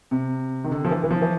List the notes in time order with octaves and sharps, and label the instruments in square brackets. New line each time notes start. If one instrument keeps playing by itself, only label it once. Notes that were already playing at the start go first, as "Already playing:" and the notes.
[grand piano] C3
D#3
D3
F3
E3
E3
F3
E3